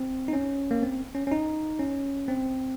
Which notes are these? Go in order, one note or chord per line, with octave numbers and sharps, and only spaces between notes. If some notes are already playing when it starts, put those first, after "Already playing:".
Already playing: C4
D#4
C#4
A#3
C4
C#4
C#4
D#4
C#4
C4